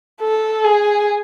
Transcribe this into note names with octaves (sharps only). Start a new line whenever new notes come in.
A4
G#4